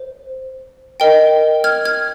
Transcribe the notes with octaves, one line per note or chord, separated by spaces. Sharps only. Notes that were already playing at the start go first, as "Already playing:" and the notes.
Already playing: C5
A#4 D#5 G5
F6 G#6
F6 G#6